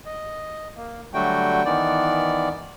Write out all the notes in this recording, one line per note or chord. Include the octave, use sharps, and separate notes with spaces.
D#5
A#3
D3 F#3 G3 A3 F#4 G5
D#3 E3 B3 D5